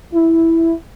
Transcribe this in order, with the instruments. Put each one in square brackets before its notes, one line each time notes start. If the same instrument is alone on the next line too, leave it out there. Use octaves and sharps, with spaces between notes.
[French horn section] E4